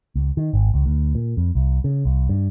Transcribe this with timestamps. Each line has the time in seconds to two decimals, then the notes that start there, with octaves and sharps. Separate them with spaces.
0.15 C#2
0.37 D#3
0.53 G#1
0.74 C#2
0.86 D2
1.15 A#2
1.37 F2
1.55 C2
1.84 C#3
2.05 C2
2.29 G2